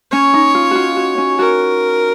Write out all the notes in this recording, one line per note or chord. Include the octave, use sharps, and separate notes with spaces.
C#4 C#5
D#4
F4
F4 F#4
F#4
C#4
F#4 A#4